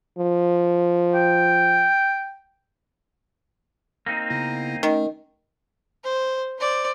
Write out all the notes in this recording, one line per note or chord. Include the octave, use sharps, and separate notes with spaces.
F3
G5
A#3 C4 D#4
C#3 B3 E4
D#3 A3 C#4
C5
C5 D5